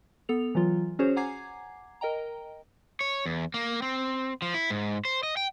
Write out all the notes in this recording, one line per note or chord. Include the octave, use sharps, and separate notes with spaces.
B3 A4 F7
E3 F#3 F4
C#4 F#4 G#4 C5 C#5
F#5 G#5 A#5 D6 G#6 C7
A#4 D#5 G5 A#5
C#5
E2
A#3
C4
F3
E4
G#2
C5
D#5
G5